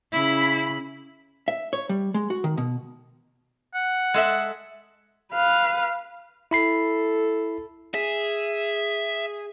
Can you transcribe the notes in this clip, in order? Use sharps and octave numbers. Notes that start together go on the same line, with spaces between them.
C#3 E4 B5
E5
C#5
G3
G#3
F#4
D#3
B2
F#5
G#3 A4 E5
B4 F5
E4 A4 B5 C7
G#4 E5